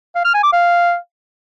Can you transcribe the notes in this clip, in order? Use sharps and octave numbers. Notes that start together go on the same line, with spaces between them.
F5
F6
G#5
D6
F5